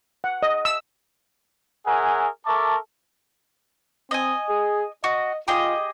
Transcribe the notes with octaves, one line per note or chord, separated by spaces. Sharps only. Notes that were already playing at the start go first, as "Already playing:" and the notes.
F#5
D#5
E6
G#4 A#4 C#5 E5 F#5 G#5
A4 A#4 E5 A5 C#6 D6
C4 D#5 G#5
G#4
F#4 D#5
F4 G4 G#4 D#5